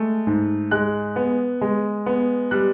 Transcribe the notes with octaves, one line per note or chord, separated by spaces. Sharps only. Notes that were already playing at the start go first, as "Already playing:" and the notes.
Already playing: G#3 A3
G#2
G#3 F#6
B3
G#3
B3
G3 F#6